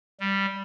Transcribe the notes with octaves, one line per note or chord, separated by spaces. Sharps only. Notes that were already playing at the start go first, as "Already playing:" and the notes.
G3